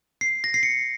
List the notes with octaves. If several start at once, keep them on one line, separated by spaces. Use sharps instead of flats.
C7
A#6
C7
C#7